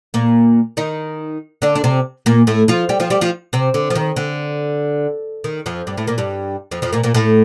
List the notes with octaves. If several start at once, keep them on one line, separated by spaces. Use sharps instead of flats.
A#2 A#3
D#3 D#4
D3 D4
D4
C3 C4
A#2 A#3
A2 A3
F3 F4
G3 G4
F3 F4
G3 G4
F3 F4
C3 C4
D3
F3
D#3
D3
D#3
F2 F3
G2 G3
A2 A3
A#2 A#3
G2 G3
F2 F3
F2 F3
A#2 A#3
A#2 A#3
A2 A3